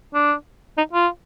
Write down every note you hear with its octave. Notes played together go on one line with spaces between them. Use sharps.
D4
D#4
F4